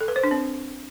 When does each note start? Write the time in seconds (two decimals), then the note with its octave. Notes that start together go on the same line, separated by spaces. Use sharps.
0.01 A4
0.08 B4
0.16 C5
0.24 D4
0.31 C4